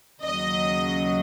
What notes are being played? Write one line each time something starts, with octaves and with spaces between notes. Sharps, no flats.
D#2 C#3 F#3 D#5